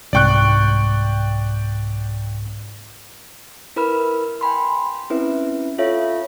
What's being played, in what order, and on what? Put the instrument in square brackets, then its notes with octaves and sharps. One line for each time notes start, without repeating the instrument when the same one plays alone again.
[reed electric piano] C2 G#2 C#6 [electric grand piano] D5 G5 F#6
[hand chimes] E4 A#4 B4 B5 F6
G5 G#5 B5 C6
C4 C#4 E4 B4 E5
F4 A4 C#5 E5 F5